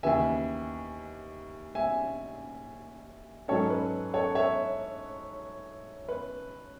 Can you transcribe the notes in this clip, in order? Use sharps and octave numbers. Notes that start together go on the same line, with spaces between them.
D#2 C#3 E3 B3 E5 G#5
E5 G#5
G#2 F#3 C#4 A4 C#5
B4
A4 C#5
C#5 E5
B4